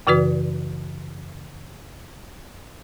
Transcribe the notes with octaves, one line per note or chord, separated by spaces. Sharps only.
F#2 C#3 E3 F#4 B4 D5